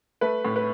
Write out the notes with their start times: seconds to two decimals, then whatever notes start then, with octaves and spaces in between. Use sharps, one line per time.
0.21 A3 B4
0.45 A2
0.56 B4